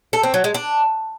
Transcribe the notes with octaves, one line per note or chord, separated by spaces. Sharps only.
A4
C4
F#3
G#3
D4